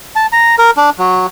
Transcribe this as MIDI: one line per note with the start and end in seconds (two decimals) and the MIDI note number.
0.16 0.26 81
0.32 0.55 82
0.58 0.71 70
0.77 0.90 62
0.98 1.27 54